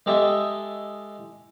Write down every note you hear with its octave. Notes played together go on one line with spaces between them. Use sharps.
G#3 G4 A4 D#5 E5 G#5